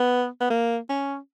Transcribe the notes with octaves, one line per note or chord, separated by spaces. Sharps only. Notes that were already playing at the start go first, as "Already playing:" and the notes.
Already playing: B3
B3
A#3
C#4